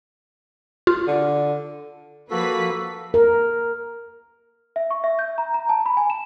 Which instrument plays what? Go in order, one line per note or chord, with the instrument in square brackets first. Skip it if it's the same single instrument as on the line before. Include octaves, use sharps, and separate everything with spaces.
[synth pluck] F4
[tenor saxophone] D3
[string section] F3 B4 B6 [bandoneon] A#3 F#4 A4
[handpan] A#4
[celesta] E5
C#6
E5
G6
A#5
A#5
A5
B5
G#5
E7